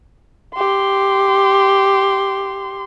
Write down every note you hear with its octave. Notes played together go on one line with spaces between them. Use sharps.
G4 C6